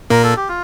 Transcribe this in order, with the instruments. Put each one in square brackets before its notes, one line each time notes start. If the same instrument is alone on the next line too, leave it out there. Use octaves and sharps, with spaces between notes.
[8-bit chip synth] A#2 A#3 [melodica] A#4
[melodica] A4
G4
F4